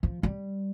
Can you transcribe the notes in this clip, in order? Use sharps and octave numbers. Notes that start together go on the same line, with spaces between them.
F3
G3